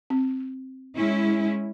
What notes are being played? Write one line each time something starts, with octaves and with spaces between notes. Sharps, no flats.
C4
G#3 C#4 E4